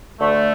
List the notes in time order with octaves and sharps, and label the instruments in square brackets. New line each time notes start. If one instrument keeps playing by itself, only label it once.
[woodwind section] D2 D3 A3